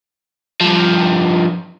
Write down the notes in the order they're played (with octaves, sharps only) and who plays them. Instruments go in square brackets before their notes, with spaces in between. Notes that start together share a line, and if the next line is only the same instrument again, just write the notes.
[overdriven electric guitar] G2 F3